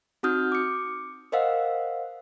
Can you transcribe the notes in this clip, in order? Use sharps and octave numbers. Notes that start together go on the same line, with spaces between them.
C4 D#4 F#4 D#6 F6 G6
D6 C#7
A#4 C5 D#5 F5 F#5 E6